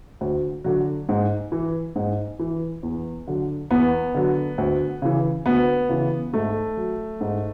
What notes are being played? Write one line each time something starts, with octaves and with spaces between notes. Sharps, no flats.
D2
D3 F#3
G#2
E3
G#2
E3
E2
D3 F#3
E2 B3
D3 F#3
D2
C#3 E3
D2 B3
C#3 E3
G#2 A3
F#3
G#2